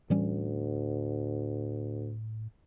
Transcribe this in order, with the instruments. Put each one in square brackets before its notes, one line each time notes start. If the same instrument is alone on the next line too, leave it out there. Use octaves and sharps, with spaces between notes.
[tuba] D2 [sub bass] A2 [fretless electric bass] E3 G3 C#4